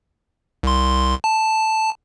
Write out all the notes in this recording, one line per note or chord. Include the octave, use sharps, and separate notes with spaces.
C2 C6
A5